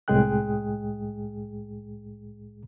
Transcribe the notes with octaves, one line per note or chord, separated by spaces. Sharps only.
C2 A2 G#3 G#4 G5 F#6